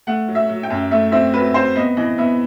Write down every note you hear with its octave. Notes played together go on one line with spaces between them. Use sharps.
A3 F#5
F#3
E5
F#3
G5
F#2
A3 E5
C4 E5
F#3 B4
C4 C5
B3 D#5
E3 D#5
B3 E5